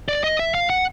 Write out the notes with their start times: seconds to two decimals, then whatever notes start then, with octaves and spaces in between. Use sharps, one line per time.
0.09 D5
0.24 D#5
0.39 E5
0.55 F5
0.70 F#5